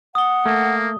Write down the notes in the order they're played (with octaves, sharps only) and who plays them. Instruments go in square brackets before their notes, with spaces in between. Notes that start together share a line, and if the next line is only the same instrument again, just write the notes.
[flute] F#5 [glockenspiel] D#6 G7
[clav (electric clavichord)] A3 [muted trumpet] A#3